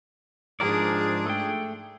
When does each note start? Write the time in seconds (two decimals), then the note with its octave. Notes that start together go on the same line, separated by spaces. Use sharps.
0.60 G#2 F3 D4 G#4 A#4 D5
1.26 A3 G5